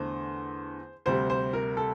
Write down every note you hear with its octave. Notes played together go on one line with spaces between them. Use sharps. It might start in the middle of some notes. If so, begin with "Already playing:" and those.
Already playing: E2 D3 A3 C5
D2 C3 G3 C5
C5
A#4
A4